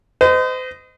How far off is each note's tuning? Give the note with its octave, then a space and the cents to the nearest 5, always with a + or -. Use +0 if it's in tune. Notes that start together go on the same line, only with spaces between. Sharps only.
C5 -40 D#5 +0